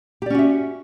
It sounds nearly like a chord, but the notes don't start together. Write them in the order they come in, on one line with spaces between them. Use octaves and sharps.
G4 D5 C#4 F#4 E5